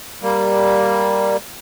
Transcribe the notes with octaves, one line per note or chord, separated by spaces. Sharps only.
G3 A#3